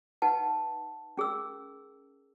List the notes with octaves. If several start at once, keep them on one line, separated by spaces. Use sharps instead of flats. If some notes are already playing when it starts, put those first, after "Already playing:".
D#4 B4 F#5 A5
C#4 G#4 A#4 E6